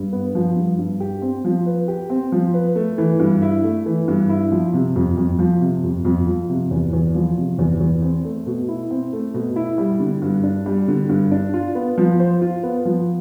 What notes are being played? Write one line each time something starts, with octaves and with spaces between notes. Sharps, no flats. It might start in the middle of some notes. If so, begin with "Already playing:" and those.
Already playing: G2
B3
F3
G2
G2
G4
C4
F3
B4
G4
C4
F3
B4
A3
E3
G2
E4
A3
E3
G2
E4
F3
C3
F2
F2
F3
C3
F2
F2
F3
C3
E2
E2
F3
C3
E2
E2
C4
A3
B2
E4
C4
A3
B2
E4
G3
D3
G2
D4
G3
D3
G2
D4
F4
B3
F3
C5
F4
B3
F3